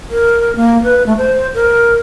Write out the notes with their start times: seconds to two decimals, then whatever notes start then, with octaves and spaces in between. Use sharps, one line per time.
0.10 A#4
0.56 A#3
0.83 B4
1.06 A3
1.18 C5
1.54 A#4